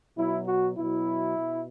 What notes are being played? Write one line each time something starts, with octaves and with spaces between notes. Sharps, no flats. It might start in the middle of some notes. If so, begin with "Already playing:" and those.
B2 F#3 E4
F#4
B2 F#3 E4
B2